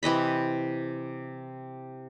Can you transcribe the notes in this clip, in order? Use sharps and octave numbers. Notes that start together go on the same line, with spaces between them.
C3 E3 D#5 B5